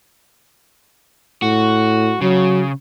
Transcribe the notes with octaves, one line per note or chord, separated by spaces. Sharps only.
A2 F#4
C#3 F#3